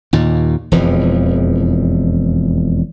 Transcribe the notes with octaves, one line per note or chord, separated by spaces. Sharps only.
D#2 A#2
E1 F2 E3 F3